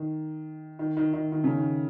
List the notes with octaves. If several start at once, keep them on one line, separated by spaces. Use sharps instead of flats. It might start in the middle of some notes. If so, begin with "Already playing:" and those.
Already playing: D#3
D#3
D#3
D#3
D#3
C#3
D#3